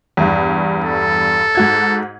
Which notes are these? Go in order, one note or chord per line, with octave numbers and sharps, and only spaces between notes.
E2 G2
A4
G#2 F#4 G#6